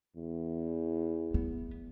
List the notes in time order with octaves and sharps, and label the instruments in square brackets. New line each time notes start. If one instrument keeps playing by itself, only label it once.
[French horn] E2
[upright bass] B3